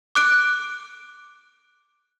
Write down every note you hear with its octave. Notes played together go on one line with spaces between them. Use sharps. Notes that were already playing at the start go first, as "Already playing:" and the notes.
D6 F#6 D7